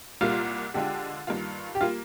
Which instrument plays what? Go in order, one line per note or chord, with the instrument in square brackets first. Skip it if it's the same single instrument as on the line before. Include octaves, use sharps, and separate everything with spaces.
[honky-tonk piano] C2 A#2 G3 A#3 [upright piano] F4
[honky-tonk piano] D3 G#3 D4 F4 [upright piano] G4
[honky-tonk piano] G2 D#3 G3 A#3 F4
[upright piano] G4
[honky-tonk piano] G3 A#3 [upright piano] F4